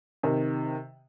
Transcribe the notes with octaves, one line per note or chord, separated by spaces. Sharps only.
C3 D#3